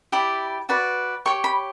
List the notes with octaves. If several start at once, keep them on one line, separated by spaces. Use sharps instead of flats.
E4 G4 D5 B5
F#4 B4 D5
G4 C#5 C#6
B5